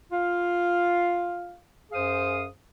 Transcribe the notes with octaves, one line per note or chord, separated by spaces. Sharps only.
F4 F5
F#2 G#4 C5 F5 D#6